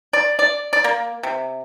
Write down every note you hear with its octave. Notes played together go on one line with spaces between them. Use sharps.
D5
D5
D5
A#3
C3